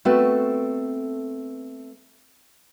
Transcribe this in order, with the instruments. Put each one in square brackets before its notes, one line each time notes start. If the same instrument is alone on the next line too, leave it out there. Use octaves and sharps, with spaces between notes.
[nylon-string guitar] A3 B3 C4 F#4 A4 B4